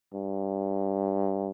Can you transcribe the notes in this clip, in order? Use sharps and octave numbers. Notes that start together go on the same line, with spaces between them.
G2